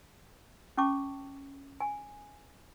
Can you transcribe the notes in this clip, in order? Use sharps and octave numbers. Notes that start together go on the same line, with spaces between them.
C#4 G5 A5 C#6 D6
G#5